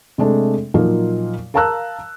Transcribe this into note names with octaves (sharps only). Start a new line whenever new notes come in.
C3 G#3 A3 D4
A#2 F3 F#3 A#3 D#4 F4
A#4 F5 A5 A#5 E6 F#6